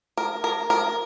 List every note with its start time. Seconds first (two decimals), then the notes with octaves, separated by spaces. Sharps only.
0.17 A#4
0.44 A#4
0.70 A#4